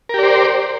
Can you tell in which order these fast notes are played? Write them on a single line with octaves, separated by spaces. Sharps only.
A#4 G4 D5 C5